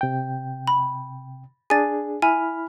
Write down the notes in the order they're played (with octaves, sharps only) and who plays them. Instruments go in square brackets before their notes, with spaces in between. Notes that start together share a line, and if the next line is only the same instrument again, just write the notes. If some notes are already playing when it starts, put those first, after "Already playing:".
[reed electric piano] C3 G5
[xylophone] B5
[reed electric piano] D4 G#4 [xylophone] G#5 A6
[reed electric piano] E4 B5 F6 [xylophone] G#5